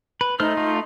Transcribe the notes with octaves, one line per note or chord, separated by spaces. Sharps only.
B4
A3 D#4 C5 F6
A3 F4